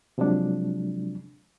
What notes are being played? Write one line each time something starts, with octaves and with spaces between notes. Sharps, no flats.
C3 F3 F#3 G#3 D4